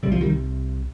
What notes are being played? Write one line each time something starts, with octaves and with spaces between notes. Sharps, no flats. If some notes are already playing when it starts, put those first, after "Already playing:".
C2 C3 G3
F3
D#3 G3